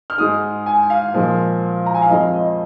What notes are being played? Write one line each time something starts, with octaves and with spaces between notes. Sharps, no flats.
F6
G#2 G#3 D#6
G#5
F5
A#2 F3 G#3
A#5
G#5
F5
F2 F3 G#3 D#5
D#5